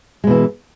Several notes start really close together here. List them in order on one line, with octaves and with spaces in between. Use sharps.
G#3 B2 E3